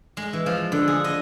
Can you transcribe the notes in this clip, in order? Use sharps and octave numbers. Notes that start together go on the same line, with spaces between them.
G#3
E3
F3
D3
G#4
D#5